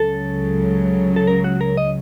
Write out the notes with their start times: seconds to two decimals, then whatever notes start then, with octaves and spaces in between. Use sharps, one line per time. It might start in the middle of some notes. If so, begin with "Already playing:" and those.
Already playing: C#2 C#3 F#3 A4
1.16 A4
1.27 A#4
1.44 F#4
1.61 A#4
1.77 D#5